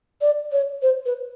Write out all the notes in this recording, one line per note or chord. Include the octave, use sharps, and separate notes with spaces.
D5
C#5
C5
B4